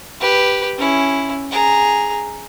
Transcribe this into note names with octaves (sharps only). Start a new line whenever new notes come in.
G4 B4
C#4 E4
G#4 A#5